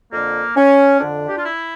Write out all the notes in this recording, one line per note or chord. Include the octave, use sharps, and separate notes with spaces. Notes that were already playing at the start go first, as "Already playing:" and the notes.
F2 D3 A#3
C#4
F2 D3 D4
G4
F4
E4